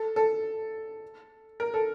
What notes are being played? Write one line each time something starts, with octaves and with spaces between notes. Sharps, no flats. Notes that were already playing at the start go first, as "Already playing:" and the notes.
Already playing: A4
A4
A#4
A4